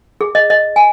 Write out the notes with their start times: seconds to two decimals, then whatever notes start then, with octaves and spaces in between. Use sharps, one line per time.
0.21 G#4
0.35 D#5
0.50 D#5
0.76 G#5